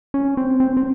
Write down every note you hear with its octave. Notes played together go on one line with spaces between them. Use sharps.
C#4
C4
C4
C4